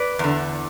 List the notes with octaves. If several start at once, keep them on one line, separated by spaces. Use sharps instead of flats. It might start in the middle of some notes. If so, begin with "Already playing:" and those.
Already playing: B4 D5
E2 D3